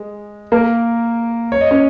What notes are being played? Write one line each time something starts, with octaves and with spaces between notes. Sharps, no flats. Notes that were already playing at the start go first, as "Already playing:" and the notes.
Already playing: G#3
A#3 A#4
C#5
D#5
C#4 C#5